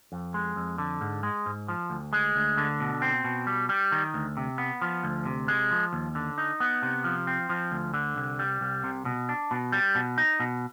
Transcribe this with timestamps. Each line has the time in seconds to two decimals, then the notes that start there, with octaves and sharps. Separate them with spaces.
0.12 F2
0.34 G#3
0.56 F2
0.78 D3
1.01 G#2
1.23 G#3
1.46 G#2
1.68 F3
1.90 D2
2.13 G#3
2.36 D2
2.58 D3
2.80 B2
3.02 C4
3.24 B2
3.47 G3
3.69 G3
3.92 D#3
4.14 D2
4.37 C3
4.58 B3
4.81 F3
5.04 D2
5.26 C3
5.48 G#3
5.71 F3
5.93 D#2
6.15 D3
6.38 D#4
6.60 B3
6.82 C3
7.04 F3
7.27 C4
7.49 F3
7.72 D2
7.94 D3
8.16 C2
8.39 G3
8.61 C2
8.84 C3
9.05 B2
9.29 D4
9.51 B2
9.72 G3
9.95 B2
10.18 D#4
10.40 B2